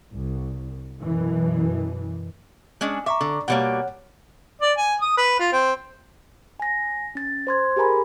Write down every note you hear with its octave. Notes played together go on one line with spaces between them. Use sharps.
C2
F#2 B2 E3
G#3 C#4 D4
E5 A#5 C#6 D6
D3
B2 G3 A#3 C#5 F#5
D5
G#5
D#6
B4
F4
C4
G#5 A#6
C#4 A6
C5 C6 G#6
G4 G#4 A#4 G#5 A#5 B5